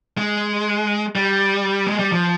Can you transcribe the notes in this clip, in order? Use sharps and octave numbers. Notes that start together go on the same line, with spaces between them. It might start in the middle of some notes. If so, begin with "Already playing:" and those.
G#3
G3
G#3
G3
F3